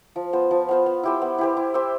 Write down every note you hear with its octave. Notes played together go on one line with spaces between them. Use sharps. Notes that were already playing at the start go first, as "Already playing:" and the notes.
F3
B3 F4 C5
F3
B3 F4 C5
B3
E4 G4 C5
B3
E4 G4 C5
E4
G4 C5 E5